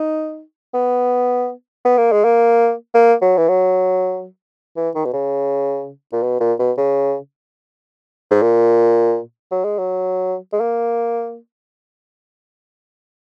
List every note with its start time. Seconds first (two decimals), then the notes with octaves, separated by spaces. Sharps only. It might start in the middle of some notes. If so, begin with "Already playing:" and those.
Already playing: D#4
0.74 B3
1.85 B3
1.98 A#3
2.12 G#3
2.24 A#3
2.94 A#3
3.22 F#3
3.37 E3
3.49 F#3
4.77 E3
4.95 D#3
5.05 B2
5.13 C#3
6.13 A#2
6.23 B2
6.40 A#2
6.59 B2
6.78 C#3
8.31 G#2
8.42 A#2
9.52 F#3
9.64 G#3
9.78 F#3
10.53 G#3
10.60 A#3